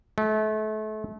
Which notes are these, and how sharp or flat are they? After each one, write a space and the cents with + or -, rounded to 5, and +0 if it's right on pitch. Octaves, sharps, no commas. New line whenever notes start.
A3 -35